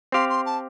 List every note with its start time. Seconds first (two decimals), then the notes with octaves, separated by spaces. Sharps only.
0.12 C4 G4 F5 C6
0.29 C6
0.46 A5